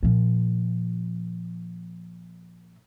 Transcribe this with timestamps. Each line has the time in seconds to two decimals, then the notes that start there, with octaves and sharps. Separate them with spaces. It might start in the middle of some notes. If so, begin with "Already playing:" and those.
0.03 A#2 F3